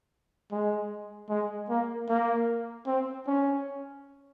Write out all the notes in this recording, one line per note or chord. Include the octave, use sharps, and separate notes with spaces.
G#3
G#3
A#3
A#3
C4
C#4